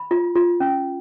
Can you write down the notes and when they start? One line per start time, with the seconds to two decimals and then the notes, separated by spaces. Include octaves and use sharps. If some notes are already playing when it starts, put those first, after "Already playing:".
Already playing: B5
0.11 F4
0.35 F4
0.60 C#4